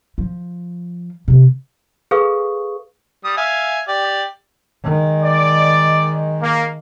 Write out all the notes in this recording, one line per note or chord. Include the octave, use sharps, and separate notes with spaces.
F3
C3 B3
G#4 A4 B4 F5 C#6 D#6
G3 D#6
E5 F5 G#5
G4 D5
D#3 G#3
D5
A#3